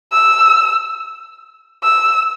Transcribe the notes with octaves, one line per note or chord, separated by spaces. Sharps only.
E6
E6